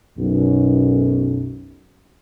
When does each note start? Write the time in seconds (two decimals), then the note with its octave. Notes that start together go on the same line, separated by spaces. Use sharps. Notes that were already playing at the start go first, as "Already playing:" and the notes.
0.19 B1 F#2